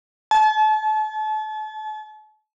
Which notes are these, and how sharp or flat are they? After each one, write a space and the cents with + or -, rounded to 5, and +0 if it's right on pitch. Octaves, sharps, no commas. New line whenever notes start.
A5 -40